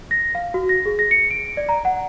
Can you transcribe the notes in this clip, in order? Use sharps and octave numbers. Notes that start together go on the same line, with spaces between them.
A#6
F5
F#4
A#6
G#4
A#6
C#7
D7
D5
A#5
F#5